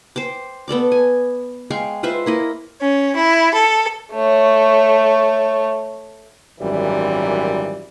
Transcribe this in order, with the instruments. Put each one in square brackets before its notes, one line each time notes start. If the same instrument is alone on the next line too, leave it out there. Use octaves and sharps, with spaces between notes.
[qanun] C5 G5 D6
B3 A4 D5 D6
G#5
G#3 F5 G5 C#6
F4 B4 C5 E5
A#3 E4 D#5
[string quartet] C#4
E4
A4
[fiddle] A3 C#5
[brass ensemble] G#1 F#2 A#2 E3 G3